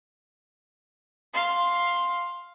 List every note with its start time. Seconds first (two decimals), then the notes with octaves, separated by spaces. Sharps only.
1.33 F5 C6